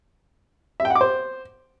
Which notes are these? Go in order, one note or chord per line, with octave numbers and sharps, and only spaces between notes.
E5
G5
F#5
D6
C5